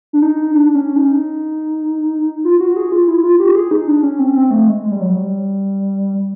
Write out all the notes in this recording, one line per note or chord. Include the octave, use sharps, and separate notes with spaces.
D4
D#4
D4
C#4
D#4
F4
F#4
G#4
F4
E4
F4
G4
G#4
D#4
D4
C#4
C4
C4
A3
G#3
G#3
G3
F#3
G3